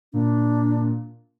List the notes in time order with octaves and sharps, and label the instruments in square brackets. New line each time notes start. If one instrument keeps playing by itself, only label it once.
[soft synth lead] A#2 [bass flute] D4